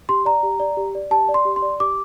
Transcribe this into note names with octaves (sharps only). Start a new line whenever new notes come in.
G4 C6
D5 A#5
G4
D5
G4
D5
G4 A5
D5
C6
G4
C6
D5
G4 D6